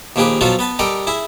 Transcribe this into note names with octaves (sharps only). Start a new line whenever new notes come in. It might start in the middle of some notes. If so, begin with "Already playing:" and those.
D#2 F3 A#3 G4 G#4 B4
B2 F3 F#3 F4 F#4 A4
B3 B4 A5
G3 G4 A4 A#4 D#5
E4 G#4 E5